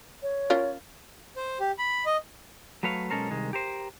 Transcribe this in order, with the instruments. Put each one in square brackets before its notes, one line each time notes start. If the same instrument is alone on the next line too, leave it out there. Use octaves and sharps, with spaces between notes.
[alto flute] C#5
[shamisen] C#4 F4 A#4
[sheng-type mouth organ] C5
G4
B5
D#5
[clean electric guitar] F#3 A3 B4 C#5 F5
B1 G#3 C#4 A4 A#4 C5
C2 D#3 G#3
G4 A#4 C5